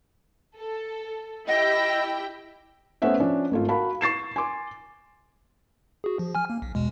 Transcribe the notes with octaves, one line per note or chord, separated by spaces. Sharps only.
A4
E4 G4 D#5 G5
A3 B3 C#4 C5 E5 F#5
F3 C#4 D4
G#1 A3 F4
F#4 A#4 F5 A5 B5
C#6 A6 C7 E7
G#5 C6 D6
F#4 G#4
F3
G#5 F6
A#3
B1
E2 B2 G#3